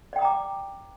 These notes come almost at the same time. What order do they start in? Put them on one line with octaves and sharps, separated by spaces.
D5 G5 D#6 A#5 D6